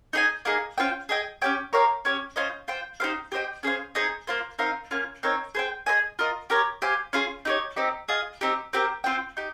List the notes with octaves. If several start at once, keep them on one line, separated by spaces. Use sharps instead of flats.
D#4 G#4 D#5 G#5
A#3 D#4 G#4
C#4 F4 C5 G5
G#4 D#5 G5
C#4 G4 C#5 G5
G4 A#4 C#5 F5
C#4 G4 C#5
C#4 F4 C5 D#5
F4 C5 G5
D#4 G4 C5 F5
G4 C5 D#5 G5
C#4 G#4 C5 F5
C4 D#4 G#4 D#5
A#3 F4 C5
C4 D#4 A#4 F5
A#3 C#4 F4
C4 D#4 A#4 C#5
G#4 C5 G5
G#4 C5 D#5 G#5
F4 A#4 D#5
G4 A#4 C#5
G4 C5 F5 G#5
C#4 F4 G#4
D#4 G4 C#5
C4 D#4 G4
F4 G#4 D#5
C4 D#4 G4
C4 G4 A#4
C4 F4 C5 G5
D#4 G4